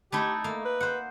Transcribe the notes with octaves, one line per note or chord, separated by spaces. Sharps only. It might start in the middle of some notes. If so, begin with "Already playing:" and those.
A3 D#4 E4 G4
A3 A#3
B4
C5 F#5